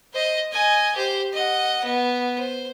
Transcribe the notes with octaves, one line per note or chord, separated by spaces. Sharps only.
C5 D#5
D#5 G#5
G4 C5
D#5 F#5
B3
C5